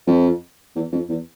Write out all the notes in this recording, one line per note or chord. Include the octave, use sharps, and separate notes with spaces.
F2
E2
F2
E2